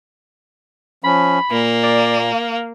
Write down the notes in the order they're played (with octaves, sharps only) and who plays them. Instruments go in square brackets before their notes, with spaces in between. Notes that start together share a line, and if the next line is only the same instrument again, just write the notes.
[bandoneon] F3 C#4 [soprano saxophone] B5
[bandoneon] A#2 [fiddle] A#3
[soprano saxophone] D5
F5